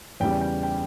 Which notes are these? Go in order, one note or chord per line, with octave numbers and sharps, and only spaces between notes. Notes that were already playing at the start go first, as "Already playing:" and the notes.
E2 C#3 G3 G5
G5
G5